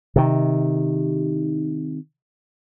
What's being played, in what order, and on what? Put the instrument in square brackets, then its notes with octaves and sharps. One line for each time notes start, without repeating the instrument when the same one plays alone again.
[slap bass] C3 D#3